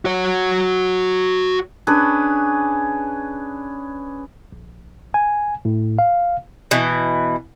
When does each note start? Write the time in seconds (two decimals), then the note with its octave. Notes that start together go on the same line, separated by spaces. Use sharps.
0.05 F#4 C#5
1.87 C#4 D4 G#4 B4
4.52 A#1
5.14 G#5
5.65 A2
5.99 F5
6.71 B2 E3